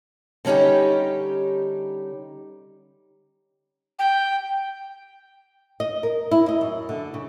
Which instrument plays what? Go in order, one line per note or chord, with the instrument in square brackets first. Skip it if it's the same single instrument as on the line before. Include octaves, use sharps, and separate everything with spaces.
[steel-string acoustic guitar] D3 G3 C#4 D#4 G4
[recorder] G5
[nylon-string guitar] D#5
A#4
E4
D#5
F#2
D3
C#3